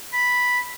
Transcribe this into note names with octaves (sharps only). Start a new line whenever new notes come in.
B5